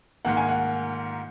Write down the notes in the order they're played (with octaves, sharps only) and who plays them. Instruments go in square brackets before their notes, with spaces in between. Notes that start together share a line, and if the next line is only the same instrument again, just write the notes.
[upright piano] G#2 D#3 A#3 [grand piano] F#5
[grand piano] G#5
F#5